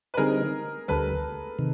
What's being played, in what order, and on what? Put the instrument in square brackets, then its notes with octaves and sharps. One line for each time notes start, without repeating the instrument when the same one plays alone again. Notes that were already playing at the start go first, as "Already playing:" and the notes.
[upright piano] B4
[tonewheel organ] D3 G3 C4 D#4 [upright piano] G#4 A#4
[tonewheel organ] D2 D3 G3 [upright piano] A4 B4
[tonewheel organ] C3 D#3